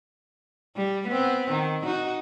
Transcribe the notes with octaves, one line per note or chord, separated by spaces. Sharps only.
G3
B3 C4
D#3
D#4 F#4